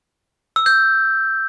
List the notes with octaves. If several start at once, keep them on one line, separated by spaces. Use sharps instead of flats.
E6
G6